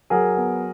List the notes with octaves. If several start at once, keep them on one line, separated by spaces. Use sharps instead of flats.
F#3 G#4 A#4
B3